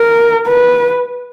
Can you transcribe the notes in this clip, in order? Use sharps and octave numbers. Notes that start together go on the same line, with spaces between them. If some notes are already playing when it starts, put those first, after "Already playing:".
Already playing: A#4
B4